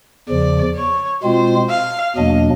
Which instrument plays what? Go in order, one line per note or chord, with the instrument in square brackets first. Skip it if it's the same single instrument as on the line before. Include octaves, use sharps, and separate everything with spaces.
[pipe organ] E2 C#3 F3 [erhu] D5
[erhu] C#5
[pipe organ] B2 G#3 C4 F4 [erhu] C5
[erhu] F5
[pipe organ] E2 B2 F#3 A#3 D4 [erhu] D#5